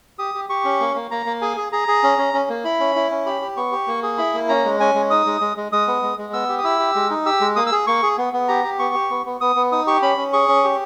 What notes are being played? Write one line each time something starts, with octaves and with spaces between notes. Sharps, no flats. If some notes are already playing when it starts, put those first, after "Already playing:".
G4 D#6
G4
G4 C#6
C#4
A#3
A#3
A#3 A#5
A#3
G#4 G#5
G#4
G#4 A#5
G#4
C#4
C#4
C#4
A#3
E4 B5
C#4
E4
C#4
G4 B5
G4
B3 C#6
G4
A#3
G#4
E4 B5
A#3
C#4 A#5
G#3
C#4 G#5
G#3
D#4 D#6
G#3
G#3
G#3
G#3 D#6
B3
G#3
G#3
B3 E6
G4
D#6
E4 E6
G4
G#3
D#4
G4 E6
G#3
A#3 D#6
E6
G#4
A#3 C#6
G#4
B3
B3
G4 A#5
G4
B3 C#6
G4
B3
B3
B3 D#6
B3
D#4 D#6
G4 C#6
C#4 B5
C#4
G#4 C#6
C#4
G4